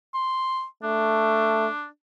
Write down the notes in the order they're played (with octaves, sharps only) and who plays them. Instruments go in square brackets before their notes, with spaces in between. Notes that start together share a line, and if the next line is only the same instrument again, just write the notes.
[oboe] C6
[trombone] A3 [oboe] D4